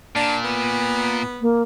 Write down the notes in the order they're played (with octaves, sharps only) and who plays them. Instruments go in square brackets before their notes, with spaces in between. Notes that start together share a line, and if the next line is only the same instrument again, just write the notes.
[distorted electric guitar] A#2 [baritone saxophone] D4
[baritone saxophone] B3
[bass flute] A#3